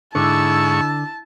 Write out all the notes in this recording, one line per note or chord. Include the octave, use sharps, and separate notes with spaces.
G#2 D3 E4 A5 C#6 E6